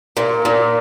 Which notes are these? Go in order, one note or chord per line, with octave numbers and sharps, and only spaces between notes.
A#2
A#2